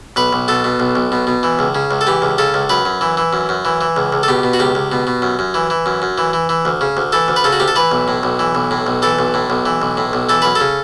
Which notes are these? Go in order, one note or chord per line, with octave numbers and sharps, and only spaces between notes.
B1 B4
B1
B2 A4
B2
B1
B1
B2
B2
E3
C#2
C#3
C#2
A4
E3 G4
C#2
C#3 A4
C#2
F#2 B4
F#2
E3
E3
F#2
F#2
E3
E3
C#2
C#2
A4
B2 G4
B2
F#4
C#2 G4
C#2
B2
B2
F#2
F#2
E3
E3
F#2
F#2
E3
E3
E3
D2
C#3
D2
E3 A4
D2
B4
C#3 A4
F#4
D2 G4
A4
E3 B4
B1
A2
B1
E3
B1
A2
B1
E3 A4
B1
A2
B1
E3
B1
A2
B1
E3 A4
F#2 B4
C#3 A4